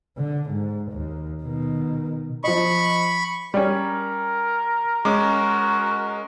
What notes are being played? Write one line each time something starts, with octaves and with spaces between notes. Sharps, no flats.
D3
G#2
D#2
B2 D#3
F3 D#5 B5 C#6
G3 C#4 A#4
G#3 C#4 F#4 D6